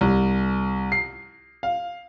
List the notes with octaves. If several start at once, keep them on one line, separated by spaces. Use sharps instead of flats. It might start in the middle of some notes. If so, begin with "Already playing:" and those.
C2
C7
F5